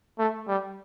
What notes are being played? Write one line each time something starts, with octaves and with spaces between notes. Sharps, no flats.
A3
G3